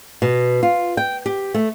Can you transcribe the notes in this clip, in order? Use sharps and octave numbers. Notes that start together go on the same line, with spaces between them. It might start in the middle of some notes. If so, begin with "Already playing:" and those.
B2
F4
G5
G4
A3